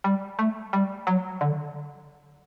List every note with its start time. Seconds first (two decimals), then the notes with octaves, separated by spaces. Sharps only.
0.04 G3
0.39 A3
0.73 G3
1.07 F#3
1.41 D3